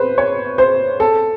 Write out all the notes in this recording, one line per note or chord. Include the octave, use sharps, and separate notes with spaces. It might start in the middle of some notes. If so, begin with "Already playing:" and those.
Already playing: B4 C5
C#5
C5
A4